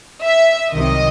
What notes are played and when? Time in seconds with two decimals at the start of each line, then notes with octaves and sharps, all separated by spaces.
0.23 E5
0.73 C2 C3 D#3 F#3 D#5